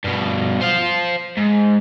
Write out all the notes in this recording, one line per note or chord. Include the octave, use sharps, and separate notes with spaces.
G2 B2
C5 F5
G#2